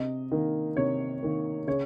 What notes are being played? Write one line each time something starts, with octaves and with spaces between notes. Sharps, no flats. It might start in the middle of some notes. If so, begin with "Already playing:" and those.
Already playing: C3 D#5
D#3 A#3
C3 C#5
D#3 A#3
C#3 C#5